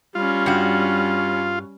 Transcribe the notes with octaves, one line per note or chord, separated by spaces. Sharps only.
G3 C#4 F4
G2 F#4